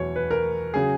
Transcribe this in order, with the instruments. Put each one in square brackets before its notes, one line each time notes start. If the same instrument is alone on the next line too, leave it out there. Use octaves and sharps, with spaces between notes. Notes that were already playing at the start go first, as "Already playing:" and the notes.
Already playing: [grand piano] E2 B2 F#3 C#5
B4
A#4
C#3 F#3 G#4